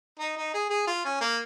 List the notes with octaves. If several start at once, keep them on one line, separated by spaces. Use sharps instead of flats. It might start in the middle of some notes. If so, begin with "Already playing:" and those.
D#4
D#4
G#4
G#4
F4
C#4
A#3